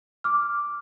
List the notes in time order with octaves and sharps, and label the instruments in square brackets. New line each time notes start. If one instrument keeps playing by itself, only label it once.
[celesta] D6 F6